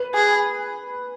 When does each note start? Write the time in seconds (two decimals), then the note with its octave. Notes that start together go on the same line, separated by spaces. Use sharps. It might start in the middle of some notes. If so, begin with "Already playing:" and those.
Already playing: B4
0.15 G#4